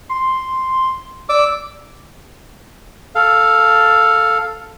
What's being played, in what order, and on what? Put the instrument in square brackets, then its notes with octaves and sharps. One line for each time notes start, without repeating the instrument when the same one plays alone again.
[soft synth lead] C6
[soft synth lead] D5 [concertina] D6 E6
[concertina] A4 F5